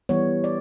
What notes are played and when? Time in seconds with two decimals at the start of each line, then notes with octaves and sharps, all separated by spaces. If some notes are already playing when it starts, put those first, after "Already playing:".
0.09 E3 G3 B3 C#5
0.44 D5